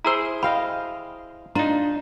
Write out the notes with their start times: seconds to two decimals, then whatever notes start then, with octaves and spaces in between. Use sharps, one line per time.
0.05 E4 G#4 C5 A#5 E6
0.43 D#5 F5 G5 B5
1.55 D4 D#4 F4 A#5